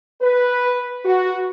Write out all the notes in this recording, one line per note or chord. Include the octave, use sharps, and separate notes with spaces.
B4
F#4